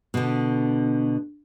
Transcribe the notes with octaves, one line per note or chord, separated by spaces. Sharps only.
B2 D3